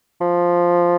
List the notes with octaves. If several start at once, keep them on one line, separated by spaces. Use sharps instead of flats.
F3